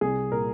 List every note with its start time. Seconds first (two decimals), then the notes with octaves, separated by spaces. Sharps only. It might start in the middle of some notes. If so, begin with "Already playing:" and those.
0.01 C2 G#4
0.32 A#2 A#4